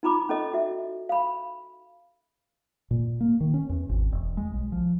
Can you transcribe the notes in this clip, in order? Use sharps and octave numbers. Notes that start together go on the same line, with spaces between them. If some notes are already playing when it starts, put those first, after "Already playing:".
D#4 F4 A#5 B5 D6
C#4 A4 D#5
F#4 E5
F5 B5
A#2
A#3
D#3
C#4
E2
G#1
E1
G#3
B1
F3